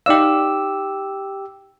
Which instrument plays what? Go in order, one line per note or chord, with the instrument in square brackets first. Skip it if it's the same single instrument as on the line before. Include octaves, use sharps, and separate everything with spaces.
[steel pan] D#4 D5 F5 [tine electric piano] G4 E6